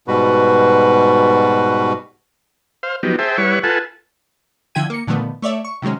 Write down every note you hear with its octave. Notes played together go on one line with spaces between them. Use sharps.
G#2 B2 G3 F#4 B4
C5 F5
F3 F#3 B3 D#4 G4
G#4 C5 E5 G5 A5
G3 E4 B4 C#5 F#5 C#6
F4 A4 B4 F#5 G#5 A5
D3 F3 E4 G5 G#6 D#7
A#3 C#7
A#2 D3 D#3 F3 A3 B3
A3 C#5 D5 E5
C#6
C3 D#3 F#3 G#3 C#4